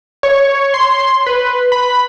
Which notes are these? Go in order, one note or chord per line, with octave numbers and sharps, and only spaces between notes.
C#5
C6
B4
B5